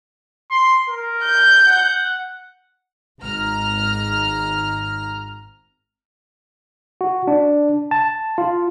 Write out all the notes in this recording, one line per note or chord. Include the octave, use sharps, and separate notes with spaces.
C6
A#4
G6
F#5
G#1 A#5 F6
F#4
D4
A5
F4